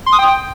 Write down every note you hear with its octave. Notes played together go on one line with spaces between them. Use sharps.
C6
D#6
G5